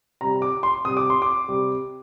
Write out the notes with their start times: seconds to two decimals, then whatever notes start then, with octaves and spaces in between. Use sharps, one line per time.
0.21 C3 G3 A#5
0.42 D6
0.63 C6
0.85 C3 G3 D#6
0.97 D6
1.10 C6
1.22 D6
1.48 C3 G3